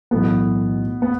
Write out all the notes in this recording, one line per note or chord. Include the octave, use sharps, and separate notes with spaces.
B1 A2 E3 A3 B3
B3